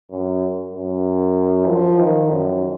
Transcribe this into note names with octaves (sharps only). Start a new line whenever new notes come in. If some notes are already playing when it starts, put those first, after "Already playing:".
F#2
F#2
F3
D#3
F#2